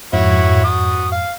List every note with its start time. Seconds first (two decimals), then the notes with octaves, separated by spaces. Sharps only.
0.13 F2 G#2 E4 F#4 C#5
0.64 F#4 D#6
1.12 F5